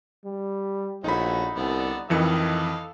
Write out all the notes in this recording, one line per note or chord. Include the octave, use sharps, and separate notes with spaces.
G3
A#1 A3 C#4 D#4 F#4 B5
C2 D3 B3 D5
F2 D#3 E3 A4 D#5 F5 C#7